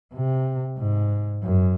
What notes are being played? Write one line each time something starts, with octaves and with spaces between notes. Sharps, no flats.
C3
G#2
F#2